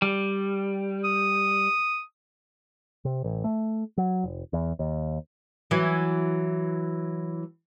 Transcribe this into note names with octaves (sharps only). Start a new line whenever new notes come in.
G3
D#6
C3
A1
A3
F#3
F1
E2
D#2
E3 F#3